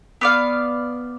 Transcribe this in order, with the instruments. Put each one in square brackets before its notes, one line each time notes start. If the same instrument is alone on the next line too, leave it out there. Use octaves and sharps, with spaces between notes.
[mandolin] B3 D5 F5